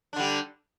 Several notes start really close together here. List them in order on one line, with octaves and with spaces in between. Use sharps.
D4 D3 G3